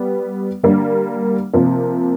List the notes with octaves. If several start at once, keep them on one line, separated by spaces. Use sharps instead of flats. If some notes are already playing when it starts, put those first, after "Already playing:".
Already playing: G3 B3 G4
D3 G3 A#3
C3 F3 A#3